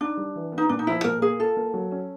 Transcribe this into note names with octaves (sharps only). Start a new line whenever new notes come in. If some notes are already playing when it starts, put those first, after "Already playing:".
D4 D#4
G3
E3
B3
D#4
A#2 D4
D#4
F3 E4
A#2 A#4
A#3 G#4
F4 A4
A#3
F#3
C#4